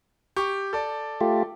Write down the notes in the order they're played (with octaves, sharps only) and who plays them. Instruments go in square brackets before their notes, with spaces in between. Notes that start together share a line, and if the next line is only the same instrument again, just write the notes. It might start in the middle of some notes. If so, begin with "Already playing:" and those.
[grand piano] G4 C#6
A4 D5
[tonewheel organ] A3 F4 G4